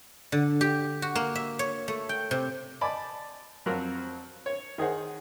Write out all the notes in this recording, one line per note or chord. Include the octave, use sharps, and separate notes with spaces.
D3
G4
F#4
A#3
E5
C#5
A3
G5
C3
D5 D#5 G#5 A5 B5 D6
F2 F3 F#3 C4 F#4 A#4
C#5
D#3 G#4 C5 F#5